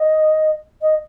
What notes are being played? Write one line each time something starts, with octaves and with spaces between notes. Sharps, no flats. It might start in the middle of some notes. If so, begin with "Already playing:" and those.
Already playing: D#5
D#5